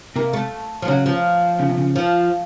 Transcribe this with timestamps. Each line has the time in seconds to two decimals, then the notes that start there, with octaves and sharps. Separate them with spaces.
0.16 C3 A#3
0.33 A3
0.82 F3
0.88 C#3 F#3
1.06 F3
1.60 C#3
1.69 C3
1.78 C#3
1.96 F3